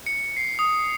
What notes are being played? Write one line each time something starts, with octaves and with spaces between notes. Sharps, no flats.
C#7
C7
D#6